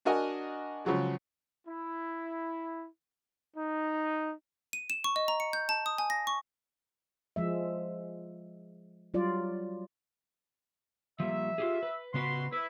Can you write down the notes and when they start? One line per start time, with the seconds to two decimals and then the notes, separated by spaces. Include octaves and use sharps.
0.05 D4 F#4 A#4 D#5 G#5
0.85 C#3 F3 F#3 G#3
1.67 E4
3.56 D#4
4.73 D#7
4.90 E7
5.04 C#6
5.16 D#5
5.28 A#5
5.40 C#7
5.53 G6
5.69 A5
5.86 D#6
5.98 G#5
6.10 A#6
6.27 C#6
7.36 F3 G#3 E5
9.14 F#3 G3 F4 D5
11.20 F3 G3 A#3 E5
11.58 F4 G4 G#4
11.83 B4
12.14 C#3 B3 F#4 B4 C6
12.53 E4 B4